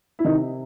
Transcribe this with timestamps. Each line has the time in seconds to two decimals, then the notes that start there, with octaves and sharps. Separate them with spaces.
0.19 E4
0.24 C3 D#3 D#4